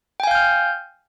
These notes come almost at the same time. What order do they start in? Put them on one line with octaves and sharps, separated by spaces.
G5 G#5 F5 G6 F6